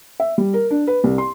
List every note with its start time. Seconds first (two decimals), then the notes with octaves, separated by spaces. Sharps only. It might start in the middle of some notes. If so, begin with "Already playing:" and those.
0.20 E5
0.38 G3
0.54 A#4
0.71 D4
0.87 B4
1.04 C2
1.18 C6